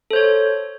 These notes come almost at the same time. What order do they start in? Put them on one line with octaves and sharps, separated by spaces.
A4 C5 C#5